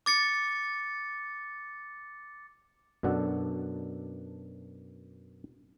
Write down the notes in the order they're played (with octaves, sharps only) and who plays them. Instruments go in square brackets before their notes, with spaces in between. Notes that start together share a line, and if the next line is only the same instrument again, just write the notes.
[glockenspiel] D6 A6 C#7
[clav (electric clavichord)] F#2 B2 D4 A4 F#5